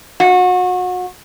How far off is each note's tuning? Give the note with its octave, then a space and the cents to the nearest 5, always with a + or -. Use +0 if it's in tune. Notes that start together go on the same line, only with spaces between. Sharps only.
F#4 -30